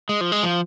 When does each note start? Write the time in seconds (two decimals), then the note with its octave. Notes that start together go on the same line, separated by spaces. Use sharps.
0.09 G#3
0.21 F3
0.32 G#3
0.43 F3